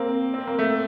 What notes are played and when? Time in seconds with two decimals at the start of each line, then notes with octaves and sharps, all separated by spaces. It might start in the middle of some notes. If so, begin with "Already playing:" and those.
Already playing: A#3 C4
0.34 C4
0.47 A#3
0.59 A3